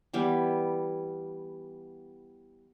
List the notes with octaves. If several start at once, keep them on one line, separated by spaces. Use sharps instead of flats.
E3 G3 B3